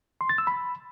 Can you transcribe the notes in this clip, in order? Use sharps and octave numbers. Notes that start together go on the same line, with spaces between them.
C6
A6
E6
B5